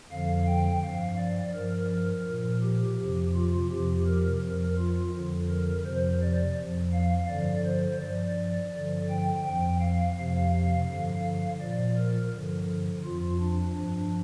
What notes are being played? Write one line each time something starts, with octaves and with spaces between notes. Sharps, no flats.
F2 D3 F3 F5
G5
G2 F3 F5
D5
G2 F3 A#4
A#2 F3
G4
F2 C3 F3
F4
F2 C3 F3 G4
A#4
F2 F3 A#4
F4
F2 D3 F3
A#4
F2 C3 F3 C5
D5
F2 F3
F5
G2 D3 F3 D5
C5
G2 F3 D5
G2 D3 F3
G5
F2 F3 G5
F5
F2 C3 F3 F5
F5
G2 D3 F3
A#2 F3 D5
A#4
G2 D3 F3
F2 F3 F4
D4
G2 F3